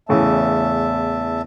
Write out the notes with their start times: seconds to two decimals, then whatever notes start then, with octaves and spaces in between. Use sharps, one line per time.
0.09 E2 A2 C#3 E3 E5 A5